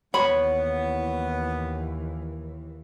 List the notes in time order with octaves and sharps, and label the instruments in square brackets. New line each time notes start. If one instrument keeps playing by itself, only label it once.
[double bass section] D#2 E3 [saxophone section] B3 [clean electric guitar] C#5 [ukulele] B5